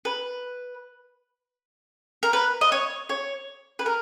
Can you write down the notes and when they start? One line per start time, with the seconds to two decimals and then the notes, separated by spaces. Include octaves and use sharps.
0.05 B4
2.23 A#4
2.33 B4
2.61 D#5
2.72 C#5
3.09 C#5
3.79 B4
3.86 A#4